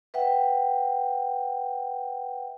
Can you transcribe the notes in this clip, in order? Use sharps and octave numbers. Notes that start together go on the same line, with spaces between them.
B4 E5 F#5 G5